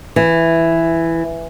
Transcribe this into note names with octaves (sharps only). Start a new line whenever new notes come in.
E3